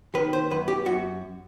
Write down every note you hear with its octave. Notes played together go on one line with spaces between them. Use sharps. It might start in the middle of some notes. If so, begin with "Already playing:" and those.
D#3 B4
C5
F#2 B4
G4
F#2 F#4